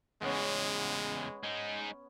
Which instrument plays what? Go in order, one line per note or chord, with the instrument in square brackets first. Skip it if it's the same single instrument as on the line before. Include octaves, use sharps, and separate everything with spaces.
[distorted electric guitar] E2 C#3 [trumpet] G#3 [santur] B3 C#4
[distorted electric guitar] G#3 D#4